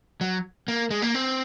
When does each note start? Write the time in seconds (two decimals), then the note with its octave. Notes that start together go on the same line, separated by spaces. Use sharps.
0.21 F#3
0.68 A#3
0.91 G#3
1.02 A#3
1.14 C4